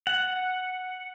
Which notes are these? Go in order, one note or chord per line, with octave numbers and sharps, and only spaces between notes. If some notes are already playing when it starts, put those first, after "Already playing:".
F#5